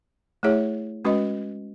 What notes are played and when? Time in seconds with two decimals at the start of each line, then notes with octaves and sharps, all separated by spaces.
0.43 A3 E4 G#4 C#5 E5
1.05 G#3 C#4 F#4 B4 D#5